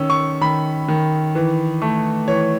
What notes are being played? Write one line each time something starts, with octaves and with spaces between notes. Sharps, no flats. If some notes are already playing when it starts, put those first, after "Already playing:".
Already playing: D#3 C#4 E6
C#6
D#3 B5
D#3
E3
A3
E3 C#5